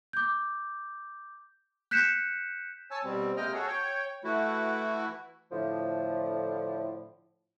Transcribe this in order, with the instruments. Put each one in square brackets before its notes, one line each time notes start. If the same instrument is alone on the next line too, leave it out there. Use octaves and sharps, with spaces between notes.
[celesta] D6 G6
F#6 G6 B6 C#7 E7
[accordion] C#5 G#5 A5 E6
B2 G3 C4
C3 G#3 A#3 D#5 G5 F6
F#4 G#4 A4 C#5
C#5 G5
E3 A3 E4 F#4
[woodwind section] A2 D3 F3